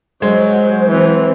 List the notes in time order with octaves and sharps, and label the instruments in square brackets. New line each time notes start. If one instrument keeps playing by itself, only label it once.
[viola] F#3 [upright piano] G#3 [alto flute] C5
[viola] E3 C4